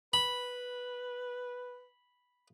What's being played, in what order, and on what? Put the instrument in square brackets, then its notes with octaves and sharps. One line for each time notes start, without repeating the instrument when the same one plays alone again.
[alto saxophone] B4 [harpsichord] B5